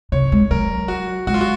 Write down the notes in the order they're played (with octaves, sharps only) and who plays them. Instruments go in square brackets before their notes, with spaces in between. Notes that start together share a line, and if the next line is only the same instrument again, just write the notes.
[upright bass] C3 [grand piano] C#5
[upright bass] G#3
[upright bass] F#3 [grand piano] A#4
[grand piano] F#4
[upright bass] G#3 [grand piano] F#4
[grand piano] F4
F#4